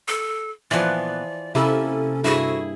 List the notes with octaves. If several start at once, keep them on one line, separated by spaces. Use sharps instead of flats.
A4
A#2 E3 F3 B3 D5
C3 A#3 C#4 E4 A4
G2 E4 F#4 G#4 E5